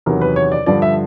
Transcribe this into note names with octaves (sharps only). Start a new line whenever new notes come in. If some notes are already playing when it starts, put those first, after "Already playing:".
E2 C3 D#3 F#3 A#4
B4
C#5
D5
G2 D3 F3 D5
E5